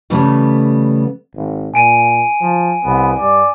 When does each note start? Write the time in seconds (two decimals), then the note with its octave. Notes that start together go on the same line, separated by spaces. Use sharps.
0.10 C#3 E3 G3 A3 B3
1.35 G#1
1.74 A#2 G#5 D7 D#7
2.41 F3
2.85 C2 B3
3.19 G2 D5